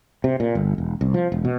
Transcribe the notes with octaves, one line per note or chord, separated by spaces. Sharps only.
C3
A#2
G1
E1
C2
F3
E1
B2